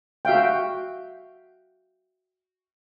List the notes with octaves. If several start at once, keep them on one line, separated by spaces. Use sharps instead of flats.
F#4 E5 F5 G5